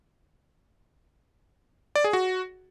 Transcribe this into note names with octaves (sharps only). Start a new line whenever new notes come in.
D5
G#4
F#4